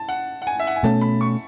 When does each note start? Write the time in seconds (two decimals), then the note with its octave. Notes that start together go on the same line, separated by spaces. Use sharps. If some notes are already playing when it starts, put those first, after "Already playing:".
Already playing: A5
0.09 F#5
0.42 F#5
0.47 G#5
0.59 E5
0.67 F#5
0.76 G#5
0.83 B2 A3 C#4 A5
1.01 B5
1.21 C#6